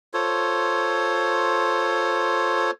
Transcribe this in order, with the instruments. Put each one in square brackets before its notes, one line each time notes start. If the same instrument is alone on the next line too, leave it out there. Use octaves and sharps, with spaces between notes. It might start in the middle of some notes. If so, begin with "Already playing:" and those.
[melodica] F4 A4 C5 C#5